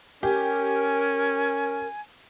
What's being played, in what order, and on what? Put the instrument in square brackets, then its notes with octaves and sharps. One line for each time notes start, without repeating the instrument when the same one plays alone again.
[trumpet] C#4 [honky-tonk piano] G4 [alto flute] A#4 [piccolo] G#5